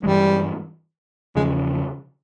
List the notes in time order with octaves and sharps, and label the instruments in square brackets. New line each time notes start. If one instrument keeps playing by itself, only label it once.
[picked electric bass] G2 E3 G#3 [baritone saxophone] G3
[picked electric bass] E2 C#3 F3 [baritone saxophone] G#3